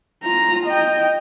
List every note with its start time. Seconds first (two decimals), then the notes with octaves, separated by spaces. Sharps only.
0.23 F4 A#5
0.66 D#5 G5